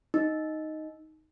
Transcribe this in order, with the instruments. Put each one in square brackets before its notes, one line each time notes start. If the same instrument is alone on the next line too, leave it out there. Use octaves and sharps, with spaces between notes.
[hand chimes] D#4